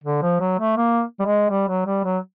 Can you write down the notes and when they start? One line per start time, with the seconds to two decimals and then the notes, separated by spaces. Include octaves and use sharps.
0.04 D3
0.22 F3
0.40 F#3
0.59 A3
0.77 A#3
1.20 G3
1.25 G#3
1.50 G3
1.68 F#3
1.86 G3
2.04 F#3